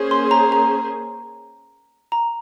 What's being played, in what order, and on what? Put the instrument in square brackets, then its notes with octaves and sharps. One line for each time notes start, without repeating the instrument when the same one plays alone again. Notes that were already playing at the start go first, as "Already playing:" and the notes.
Already playing: [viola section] A#3 C#4 G#4 C5
[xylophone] C6
A#5
A#5
A#5